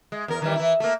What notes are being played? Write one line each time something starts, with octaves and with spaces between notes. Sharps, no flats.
G#3
E2 A#4
D#3 E3 G3
E3 E4
A3 A#3